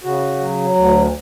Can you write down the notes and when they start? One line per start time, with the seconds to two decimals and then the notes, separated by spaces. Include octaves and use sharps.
0.04 C#3 F#4
0.40 F#3
0.75 D2